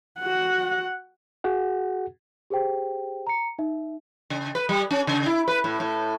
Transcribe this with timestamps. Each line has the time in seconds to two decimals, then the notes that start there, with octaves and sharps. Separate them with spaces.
0.20 F#4 F#5
1.44 F#4 G#4 F#5
2.50 G4 G#4 C5 G5
3.27 A#5 C#7
3.59 D#4 E5
4.30 C#3
4.55 B4
4.69 G3
4.91 C#4
5.07 C#3
5.26 E4
5.48 B4
5.64 A2
5.80 A2